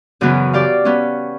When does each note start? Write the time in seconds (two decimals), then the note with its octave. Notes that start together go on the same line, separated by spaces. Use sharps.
0.21 F#2 C#3 E3 F#3 B3
0.53 G4 D5 F5
0.85 B3 C#4